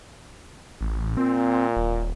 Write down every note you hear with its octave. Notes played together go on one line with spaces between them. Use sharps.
A1
A#2 C4
D#1